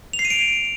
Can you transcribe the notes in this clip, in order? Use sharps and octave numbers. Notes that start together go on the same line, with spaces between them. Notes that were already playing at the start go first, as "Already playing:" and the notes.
F7
C7
D#7
D7